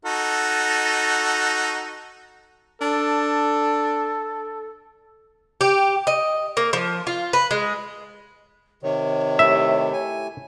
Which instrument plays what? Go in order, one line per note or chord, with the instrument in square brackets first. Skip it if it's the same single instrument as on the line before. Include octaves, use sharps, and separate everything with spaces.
[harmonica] D#4 F#4 A4
[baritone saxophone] D4 [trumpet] A4
[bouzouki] G4
D#5
A#3
F3
F4
B4
G#3
[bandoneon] C3 D#3 [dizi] C#5
[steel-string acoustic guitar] A3 E4 G4 [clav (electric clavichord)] E5
[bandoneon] G#5